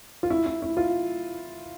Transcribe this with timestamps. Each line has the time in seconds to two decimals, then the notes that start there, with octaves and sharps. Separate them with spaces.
0.23 F4
0.30 E4
0.46 E4
0.62 E4
0.77 F4